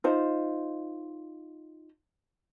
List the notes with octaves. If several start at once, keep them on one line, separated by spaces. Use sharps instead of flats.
D#4 F4 C5